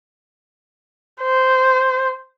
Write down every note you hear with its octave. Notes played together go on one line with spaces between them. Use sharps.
C5